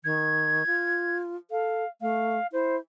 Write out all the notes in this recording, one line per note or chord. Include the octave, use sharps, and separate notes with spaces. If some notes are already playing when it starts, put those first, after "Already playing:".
D#3 G#6
F4
A4 F5
A3 F5
E4 C5